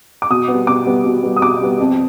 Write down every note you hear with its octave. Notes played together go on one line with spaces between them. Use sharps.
D6
B2 D#6
B3
G3
B2 D6
G3 B3
B2
G3 B3
D#6
B2 D6
G3 B3
F2